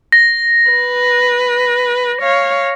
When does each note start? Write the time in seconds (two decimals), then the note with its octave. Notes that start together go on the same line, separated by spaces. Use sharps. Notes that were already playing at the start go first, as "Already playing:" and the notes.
0.12 A#6
0.71 B4
2.22 C#5 F5